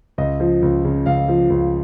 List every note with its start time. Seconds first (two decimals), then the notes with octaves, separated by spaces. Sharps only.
0.18 C#2 D#5
0.40 F3
0.62 C#2
0.85 C#3
1.06 C#2 F5
1.28 F3
1.50 C#2